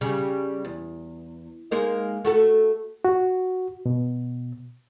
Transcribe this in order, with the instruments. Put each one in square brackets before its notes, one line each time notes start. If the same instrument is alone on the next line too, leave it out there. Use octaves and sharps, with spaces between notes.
[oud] C#3 G3
E2
G#3 A#3 D#4
A3 F#4 A4
[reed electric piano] F#4
B2